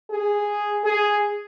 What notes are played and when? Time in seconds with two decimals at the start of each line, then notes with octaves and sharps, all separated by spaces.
0.10 G#4
0.84 G#4